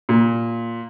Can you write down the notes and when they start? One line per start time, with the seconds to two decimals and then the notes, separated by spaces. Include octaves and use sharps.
0.09 A#2